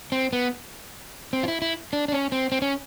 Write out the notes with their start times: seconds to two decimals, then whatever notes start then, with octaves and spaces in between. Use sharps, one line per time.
0.12 C4
0.33 B3
1.33 C4
1.43 F4
1.48 E4
1.62 E4
1.93 D4
2.08 D4
2.12 C#4
2.32 C4
2.52 C4
2.62 C#4